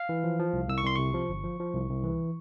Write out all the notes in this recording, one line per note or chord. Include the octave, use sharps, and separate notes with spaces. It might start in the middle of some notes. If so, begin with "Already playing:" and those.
Already playing: F5
E3
F3
F3
C2
C2 E6
C#6
C2 C6
C3 C#6
F3
G1
F3
F3
C2
C2
E3